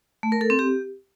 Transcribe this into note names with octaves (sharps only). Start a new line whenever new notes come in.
A3
A#4
A4
C4
G4